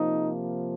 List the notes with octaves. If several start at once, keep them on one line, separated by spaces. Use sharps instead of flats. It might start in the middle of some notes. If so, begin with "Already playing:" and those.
Already playing: C3 F3 A#3 D#4